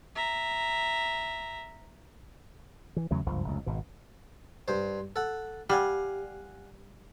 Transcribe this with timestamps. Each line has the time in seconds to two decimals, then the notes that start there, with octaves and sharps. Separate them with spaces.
0.15 E5 A#5
2.96 E3
3.11 E2 C#3 F#3 A3
3.26 F#1 C#2 G2 F3
3.44 F1 C#2
3.66 G#1 B2
4.68 G2 C5
5.16 A4 F#5
5.70 G3 F5 F#5 G#5